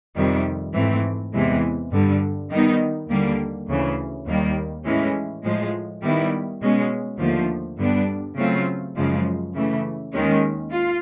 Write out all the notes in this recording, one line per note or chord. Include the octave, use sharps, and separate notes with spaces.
F2 C3 D#3 G3
G#2 E3 A3 C4
E2 C3 E3 G#3
G2 D3 G3
D#3 G3 B3 D#4
D#2 D3 G3 A#3
D2 C#3 E3
D#2 D#3 G3 A#3
A2 E3 G#3 C#4
A2 F3 G#3
D#3 G3 B3 E4
B2 G#3 C#4
D#2 D3 F3 A3
G2 D3 G3 B3 D4
C#3 F#3 A3 C4 F4
F#2 C#3 F3 G#3
C#3 E3 A3
D#2 D#3 G#3 C#4
F4